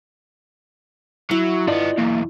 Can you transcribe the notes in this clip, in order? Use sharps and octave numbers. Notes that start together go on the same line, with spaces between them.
F#3 E4
G2 B3 F4 D5 D#5
B1 E2 A#3